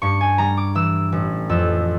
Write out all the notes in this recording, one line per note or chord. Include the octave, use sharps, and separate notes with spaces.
G2 C#6
G#5
G3 A#5
D6
E3 E6
A1
F2 E6